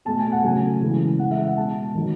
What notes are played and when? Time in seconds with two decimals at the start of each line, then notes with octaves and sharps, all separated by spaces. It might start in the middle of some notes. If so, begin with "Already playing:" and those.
0.05 B2 A3 A5
0.19 G#5
0.32 F#5
0.43 C#3 F#3 A3 G#5
0.82 C#3 E3 G#3
1.19 C#3 E3 G#3 F#5
1.31 E5
1.43 F#5
1.57 B2 G#3 A5
1.95 D#3 F#3 A3